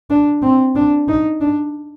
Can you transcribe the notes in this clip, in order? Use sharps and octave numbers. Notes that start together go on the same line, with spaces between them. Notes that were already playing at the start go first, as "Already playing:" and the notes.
D4
C4
D4
D#4
D4